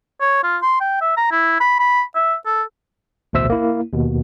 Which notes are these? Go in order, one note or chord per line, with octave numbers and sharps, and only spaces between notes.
C#5
F4
C6
G5
E5
A#5
E4
B5
B5
E5
A4
A1 D2 B2 C5 E5 E6
A#3 E4
D#2 B2